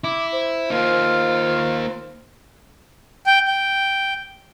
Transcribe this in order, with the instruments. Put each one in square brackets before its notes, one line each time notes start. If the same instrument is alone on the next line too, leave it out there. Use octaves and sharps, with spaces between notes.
[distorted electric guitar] E4 [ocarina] D6
[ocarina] C5
[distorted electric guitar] A#3 D#4 [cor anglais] F4
[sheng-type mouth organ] G5
G5